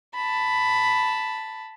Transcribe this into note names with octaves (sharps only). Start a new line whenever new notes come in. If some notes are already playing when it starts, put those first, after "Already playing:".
A5 B5